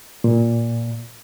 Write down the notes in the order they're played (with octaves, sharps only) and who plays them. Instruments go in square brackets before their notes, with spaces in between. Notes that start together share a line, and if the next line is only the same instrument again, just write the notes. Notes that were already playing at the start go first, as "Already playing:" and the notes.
[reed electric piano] A#2